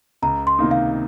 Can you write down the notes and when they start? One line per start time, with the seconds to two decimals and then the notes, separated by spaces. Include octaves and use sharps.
0.22 C#2 A#5
0.47 C6
0.59 C3 D#3 A#3 D#4
0.71 F5